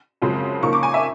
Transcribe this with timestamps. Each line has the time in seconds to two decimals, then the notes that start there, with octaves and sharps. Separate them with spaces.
0.22 F#2 C#3 F3 G#3 C4
0.63 C#3 F3 A#3 D#4 C#6
0.73 D6
0.83 G#5
0.94 E5